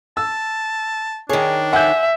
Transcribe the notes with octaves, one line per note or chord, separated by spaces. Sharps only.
A5 E6
D#3 D4 G#4 C#5
E5 F#5 G#5 G6